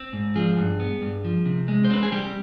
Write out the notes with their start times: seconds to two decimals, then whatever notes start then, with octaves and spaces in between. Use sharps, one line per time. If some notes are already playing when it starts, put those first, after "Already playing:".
Already playing: C4
0.13 G#2
0.35 F3 G#4
0.57 G2
0.80 B3
1.02 G2
1.24 F3
1.46 C3
1.68 G#3
1.85 C5
1.90 C4 B4
2.03 G#4
2.12 G3 G4